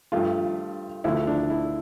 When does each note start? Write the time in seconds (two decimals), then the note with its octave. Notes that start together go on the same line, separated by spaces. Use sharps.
0.12 G2 F3 A3 F4
1.04 D2 D3 F3 A3 E4
1.27 D4
1.50 E4